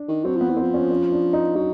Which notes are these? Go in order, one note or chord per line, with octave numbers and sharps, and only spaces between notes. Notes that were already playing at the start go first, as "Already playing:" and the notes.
Already playing: D4
D#3
F#3 C4
F3 B3
E3
C4
F3
C#4
C#4
D4
D#4
F#3 D#4